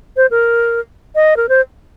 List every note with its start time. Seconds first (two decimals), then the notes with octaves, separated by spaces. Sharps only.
0.17 C5
0.31 A#4
1.15 D#5
1.37 A#4
1.49 C5